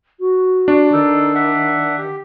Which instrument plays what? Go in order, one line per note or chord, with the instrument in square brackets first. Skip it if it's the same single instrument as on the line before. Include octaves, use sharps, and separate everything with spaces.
[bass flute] F#4
[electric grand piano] D4
[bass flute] D#3 [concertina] D#4 A4
[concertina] E5 F#5
G4